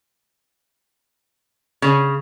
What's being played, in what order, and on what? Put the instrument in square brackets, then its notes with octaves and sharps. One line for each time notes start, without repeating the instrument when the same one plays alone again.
[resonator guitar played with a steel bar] C#3